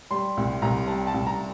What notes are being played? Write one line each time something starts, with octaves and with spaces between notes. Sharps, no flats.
G3 C6
C2
C2 A#5
G3 A5
A5
C2
A#5